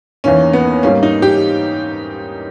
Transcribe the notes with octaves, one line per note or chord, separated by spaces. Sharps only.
E2 D#3 A#3 C#4
B3
G#2 G3 A#3 C#4
D#4
G4